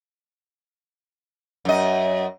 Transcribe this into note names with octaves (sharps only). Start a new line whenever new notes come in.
F#2 D#5